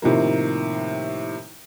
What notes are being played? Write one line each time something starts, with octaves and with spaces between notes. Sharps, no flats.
A2 C3 D#3 F3 A#3